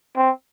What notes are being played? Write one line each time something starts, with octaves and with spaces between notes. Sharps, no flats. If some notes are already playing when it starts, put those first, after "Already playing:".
C4